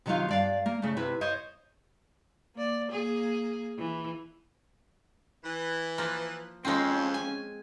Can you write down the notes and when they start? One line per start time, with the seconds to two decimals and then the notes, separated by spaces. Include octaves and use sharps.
0.06 C3 D#3 F#3 D#4 F4 F5
0.29 G2 D5 F5
0.66 A#3
0.82 C#3 A3
0.97 C3 E4 B4
1.21 C5 C#5 D#5
2.55 A#3 D5
2.91 A#3 G#4
3.78 E3
5.43 E3
5.98 F3 A#3
6.65 F2 G#3 C4 C#4
7.14 G#5